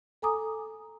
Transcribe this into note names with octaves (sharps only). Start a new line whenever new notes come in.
A4 G#5 A#5 D6 D#6